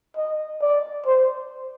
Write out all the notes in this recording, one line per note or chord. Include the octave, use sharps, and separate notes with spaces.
D#5
D5
C5